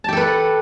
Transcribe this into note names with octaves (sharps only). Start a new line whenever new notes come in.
G4 A4 B4 F#5 A5